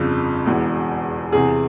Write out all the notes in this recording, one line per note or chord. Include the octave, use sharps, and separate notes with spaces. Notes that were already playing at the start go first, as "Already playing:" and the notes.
Already playing: G1 F2 C#3 F3
E1 E2 E3
E2 C3 E3 G#4